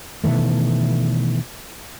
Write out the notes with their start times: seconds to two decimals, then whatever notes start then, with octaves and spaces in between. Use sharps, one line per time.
0.24 B2 D#3 E3 A3